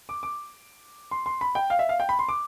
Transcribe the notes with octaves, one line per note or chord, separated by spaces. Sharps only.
D6
D6
C6
C6
B5
G5
F5
E5
F5
G5
B5
C6
D6